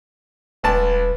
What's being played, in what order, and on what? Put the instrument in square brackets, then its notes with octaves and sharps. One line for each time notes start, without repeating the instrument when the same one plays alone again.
[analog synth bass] D#1 [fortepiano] C#2 A5 [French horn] B4